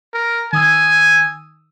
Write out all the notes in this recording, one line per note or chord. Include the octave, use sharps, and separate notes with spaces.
A#4
D#3 G#5 D#6 E6